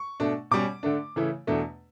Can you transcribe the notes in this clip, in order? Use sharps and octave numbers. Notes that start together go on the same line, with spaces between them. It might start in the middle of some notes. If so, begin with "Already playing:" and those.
Already playing: C#6
B2 A3 D4
B2 G3 C#4 D6
D3 A3 D4
C#3 E3 A3 E4
E2 B2 A3 D4